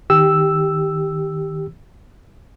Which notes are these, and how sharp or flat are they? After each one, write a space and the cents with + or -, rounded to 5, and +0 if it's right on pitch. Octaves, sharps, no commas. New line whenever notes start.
D#3 +0 G4 +0 E6 +0